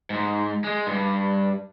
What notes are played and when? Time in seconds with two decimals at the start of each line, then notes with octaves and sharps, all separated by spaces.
0.10 G#2
0.64 G#3
0.87 G2